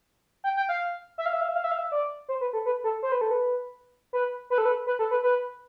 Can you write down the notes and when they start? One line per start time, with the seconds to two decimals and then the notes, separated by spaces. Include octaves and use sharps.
0.44 G5
0.57 G5
0.69 F5
1.18 E5
1.26 F5
1.33 E5
1.41 F5
1.48 E5
1.56 F5
1.64 E5
1.71 F5
1.78 E5
1.92 D5
2.29 C5
2.41 B4
2.53 A4
2.66 B4
2.84 A4
3.03 C5
3.12 B4
3.21 A4
3.31 B4
4.13 B4
4.50 B4
4.58 A4
4.65 B4
4.87 B4
4.99 A4
5.11 B4
5.23 B4